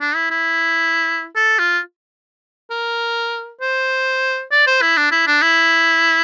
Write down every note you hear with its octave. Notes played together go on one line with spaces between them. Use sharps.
D4
E4
E4
A4
F4
A#4
C5
D5
C5
E4
D4
E4
D4
E4